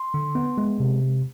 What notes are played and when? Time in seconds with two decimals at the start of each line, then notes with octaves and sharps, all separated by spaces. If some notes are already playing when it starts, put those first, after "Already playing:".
Already playing: C6
0.14 D3
0.35 B3
0.58 G#3
0.80 C3